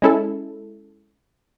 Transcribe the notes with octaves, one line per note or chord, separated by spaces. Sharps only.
G#3 C#4 E4 A4